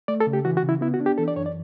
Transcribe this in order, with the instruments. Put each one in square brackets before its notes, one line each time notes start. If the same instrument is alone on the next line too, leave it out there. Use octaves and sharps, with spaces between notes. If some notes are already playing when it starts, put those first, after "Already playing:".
[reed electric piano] A3 D5
A4
C#3
G4
E3 F#4
F#4
C#3
E4
B3 E4
F#4
D4
G4
E3 A4
D5
F#2 C#5
D5